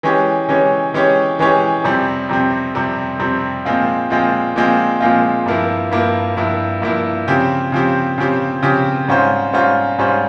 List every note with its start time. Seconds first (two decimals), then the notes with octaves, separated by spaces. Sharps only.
0.03 E3 G#3 C#4 G4 C#5
0.49 E3 G#3 C#4 G4 C#5
0.94 E3 G#3 C#4 G4 C#5
1.39 E3 G#3 C#4 G4 C#5
1.84 F2 C3 G3 C4
2.29 F2 C3 G3 C4
2.75 F2 C3 G3 C4
3.19 F2 C3 G3 C4
3.65 A#2 F3 G#3 C4 F4
4.10 A#2 F3 G#3 C4 F4
4.56 A#2 F3 G#3 C4 F4
5.00 A#2 F3 G#3 C4 F4
5.46 G2 F3 A#3 E4
5.91 G2 F3 A#3 E4
6.37 G2 F3 A#3 E4
6.82 G2 F3 A#3 E4
7.27 C#3 F3 C4 G4
7.72 C#3 F3 C4 G4
8.18 C#3 F3 C4 G4
8.62 C#3 F3 C4 G4
9.08 G#2 G3 C#4 F4 C5
9.53 G#2 G3 C#4 F4 C5
9.98 G#2 G3 C#4 F4 C5